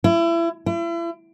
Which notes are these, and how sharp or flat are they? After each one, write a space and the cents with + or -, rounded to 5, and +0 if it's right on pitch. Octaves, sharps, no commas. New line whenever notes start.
E4 +30
E4 +40